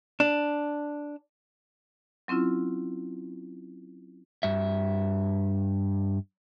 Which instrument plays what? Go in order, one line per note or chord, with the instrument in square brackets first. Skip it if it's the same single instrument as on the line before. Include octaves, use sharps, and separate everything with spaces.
[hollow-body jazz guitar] D4
[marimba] F#3 C4 C#4 E4 F4
[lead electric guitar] G2 E5